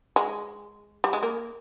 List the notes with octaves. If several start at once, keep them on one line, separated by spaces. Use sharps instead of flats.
G#3
G3
G#3
A#3